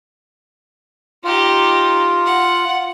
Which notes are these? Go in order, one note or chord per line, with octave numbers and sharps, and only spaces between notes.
D#4 F4 G4
F#5